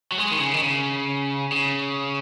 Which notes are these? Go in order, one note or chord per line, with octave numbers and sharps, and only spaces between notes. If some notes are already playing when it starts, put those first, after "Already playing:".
F#3
G#3
D#3
C#3
D#3
C#3
C#3